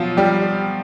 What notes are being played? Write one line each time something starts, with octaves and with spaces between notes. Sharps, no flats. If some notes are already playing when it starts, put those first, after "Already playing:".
Already playing: B2 F3 F#3 F4
G3 G4